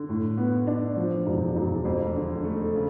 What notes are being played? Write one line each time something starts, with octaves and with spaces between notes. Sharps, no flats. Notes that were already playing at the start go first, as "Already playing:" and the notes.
Already playing: D3
A2
B3
D4
F3
E1
E1
F2
D3
A3
C#3